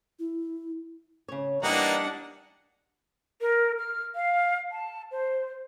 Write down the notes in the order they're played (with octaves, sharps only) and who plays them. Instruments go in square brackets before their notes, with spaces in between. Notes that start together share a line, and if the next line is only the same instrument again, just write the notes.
[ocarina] E4
[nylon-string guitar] C#3 C#5
[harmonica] E3 A#3 D#4 [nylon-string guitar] G3 [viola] D4 F#5
[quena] A#4
F6
F5
A5
C5